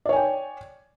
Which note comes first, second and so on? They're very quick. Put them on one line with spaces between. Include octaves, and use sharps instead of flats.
D5 C#5 G#5 G5